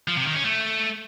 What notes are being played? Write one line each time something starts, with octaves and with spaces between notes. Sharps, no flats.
F3
C3
D#3
C#4
A3